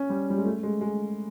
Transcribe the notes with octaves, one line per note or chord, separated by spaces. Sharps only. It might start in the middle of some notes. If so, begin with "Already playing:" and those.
Already playing: C#4
G3
G3
G#3
A3
G#3
G#3